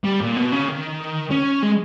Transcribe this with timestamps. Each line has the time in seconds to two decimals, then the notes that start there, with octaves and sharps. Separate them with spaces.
0.04 G3
0.21 A#2
0.37 B2
0.52 C#3
0.68 D#3
1.31 C#4
1.63 G#3